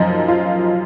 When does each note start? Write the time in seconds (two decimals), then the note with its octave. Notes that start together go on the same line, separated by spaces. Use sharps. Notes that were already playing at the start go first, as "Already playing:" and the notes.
Already playing: F#2 F3 D#4
0.28 F4